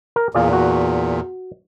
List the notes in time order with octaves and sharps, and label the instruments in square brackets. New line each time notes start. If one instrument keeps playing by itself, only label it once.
[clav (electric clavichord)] A#4
[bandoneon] E2 A#2 [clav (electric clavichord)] F4 G#4 D5
[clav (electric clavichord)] F#4